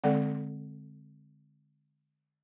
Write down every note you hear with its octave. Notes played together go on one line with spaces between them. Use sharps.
D3 G#3 C4 A4 D5 F#5